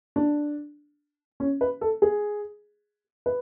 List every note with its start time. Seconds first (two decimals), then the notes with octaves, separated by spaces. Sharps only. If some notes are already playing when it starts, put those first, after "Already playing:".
0.16 D4
1.40 C#4
1.61 B4
1.81 A4
2.02 G#4
3.26 B4